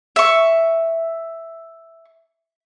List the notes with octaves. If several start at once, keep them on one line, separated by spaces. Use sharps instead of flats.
E5 C#6